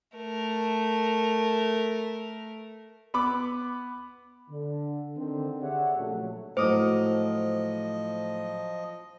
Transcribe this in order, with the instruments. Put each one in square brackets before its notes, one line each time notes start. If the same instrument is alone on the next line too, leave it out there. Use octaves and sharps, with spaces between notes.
[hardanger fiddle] A3 A#4
[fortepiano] B3 B5 D6
[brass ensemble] D3
D3 D#3 C4
G4 G#4 C#5 D5 E5 F#5
A#1 C#3 F#3 A3
[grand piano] A2 F#3 [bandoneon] F3 D#5 [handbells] C5 [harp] D6 D#6